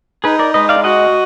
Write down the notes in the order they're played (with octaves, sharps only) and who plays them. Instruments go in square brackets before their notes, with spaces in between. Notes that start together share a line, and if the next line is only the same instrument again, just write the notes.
[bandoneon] D#4 [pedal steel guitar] G#4 B4
[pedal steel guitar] A#4 D5
[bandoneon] G#3 [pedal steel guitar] B4 D#5
[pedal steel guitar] D5 F5
[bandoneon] F#4 [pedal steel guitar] D#5 F#5